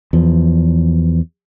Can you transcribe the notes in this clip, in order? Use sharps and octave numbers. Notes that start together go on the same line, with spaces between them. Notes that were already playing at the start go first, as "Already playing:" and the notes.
E2 F3